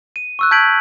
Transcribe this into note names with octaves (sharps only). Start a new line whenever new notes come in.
D#7
C#6 E6 F#6
A5 G6 G#6 B6 D7 F#7